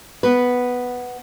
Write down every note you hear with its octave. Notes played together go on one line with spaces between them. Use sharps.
B3 B4